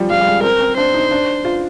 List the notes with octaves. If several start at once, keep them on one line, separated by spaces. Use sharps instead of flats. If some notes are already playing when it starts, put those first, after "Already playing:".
Already playing: F3 G3
G3 F5
G3
G#3
C4 A#4
C4
D4 C5
D#4
D4
F4